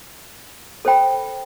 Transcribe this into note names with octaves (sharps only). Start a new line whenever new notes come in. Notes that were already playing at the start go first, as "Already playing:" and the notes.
A4 C5 G5 B5